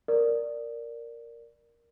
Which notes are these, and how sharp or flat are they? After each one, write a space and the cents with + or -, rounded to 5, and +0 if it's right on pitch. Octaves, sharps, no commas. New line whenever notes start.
A#4 +0 D5 +0